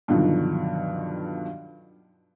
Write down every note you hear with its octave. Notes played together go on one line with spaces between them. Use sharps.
G2 B2 D3 D#3 F3 F#3